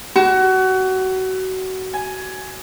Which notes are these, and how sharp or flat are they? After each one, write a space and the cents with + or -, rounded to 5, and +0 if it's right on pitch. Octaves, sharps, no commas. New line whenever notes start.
F#4 +25
G#5 +15